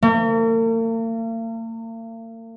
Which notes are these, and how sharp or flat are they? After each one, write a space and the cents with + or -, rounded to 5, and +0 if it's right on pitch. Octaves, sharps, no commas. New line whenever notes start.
A#3 -45